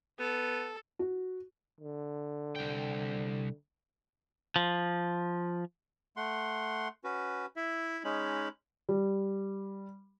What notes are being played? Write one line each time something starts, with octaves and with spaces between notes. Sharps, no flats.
B3 A4
F#4
D3
C2 G5
F3
A3 F#5 C6
C#4 F#4 B4
E4 E5
G#3 C#4 D#4 B5
G3